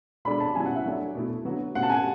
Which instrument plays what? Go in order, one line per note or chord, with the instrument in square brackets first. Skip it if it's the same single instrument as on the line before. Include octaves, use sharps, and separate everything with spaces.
[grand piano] B2 G#3 D4 A4 D5 [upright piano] B5
[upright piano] A5
[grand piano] B2 F#3 C#4 E4 [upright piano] G#5
[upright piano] F#5
E5
[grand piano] F#3 A3 D4
B2 A3 E4
D3 F#3 B3 F#4
[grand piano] B2 A3 C#4 [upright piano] F#5
[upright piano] A5
G#5